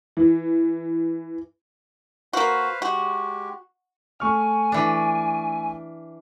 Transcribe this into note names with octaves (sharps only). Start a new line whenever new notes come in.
E3
A#3 F#4 B4 C5 F5
G#3 F#4 G4
A3 G#5 C#6 F6
E3 D4